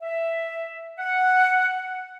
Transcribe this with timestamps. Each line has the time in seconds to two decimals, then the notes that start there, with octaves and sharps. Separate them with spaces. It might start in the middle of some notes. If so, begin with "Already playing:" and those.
0.02 E5
0.99 F#5